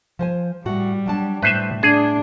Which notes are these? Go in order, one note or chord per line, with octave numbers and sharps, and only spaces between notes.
F3 C5 G#5
A2 G3 F#4
F#3 D4 A5
A2 A3 B4 C5 E5
D4 G#4